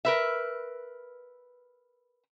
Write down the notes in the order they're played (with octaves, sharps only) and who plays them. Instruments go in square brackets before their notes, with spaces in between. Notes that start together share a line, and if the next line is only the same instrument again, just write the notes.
[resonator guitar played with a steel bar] A#4 B4 E5